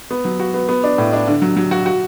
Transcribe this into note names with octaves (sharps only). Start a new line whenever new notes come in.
B3
F#3
F#4
B3
B3
D4
A2
D4
D3
F#3
F#3
F#4
F#4